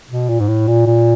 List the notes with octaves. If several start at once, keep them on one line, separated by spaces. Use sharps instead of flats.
B2
A#2
G#2
A2
A#2
A#2